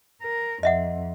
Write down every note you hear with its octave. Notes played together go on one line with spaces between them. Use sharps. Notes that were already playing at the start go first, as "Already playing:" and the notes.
A#4
F2 D#5 E5 F#5